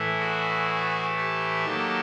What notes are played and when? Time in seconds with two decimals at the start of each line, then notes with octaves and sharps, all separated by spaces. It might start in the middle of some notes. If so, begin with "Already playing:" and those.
Already playing: A2 E3 A3
0.19 F#4 G#4
1.16 G4 A4
1.65 D#3 F#3 A#3